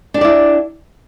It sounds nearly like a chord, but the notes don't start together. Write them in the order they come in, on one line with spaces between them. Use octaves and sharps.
D4 G4 D5 E4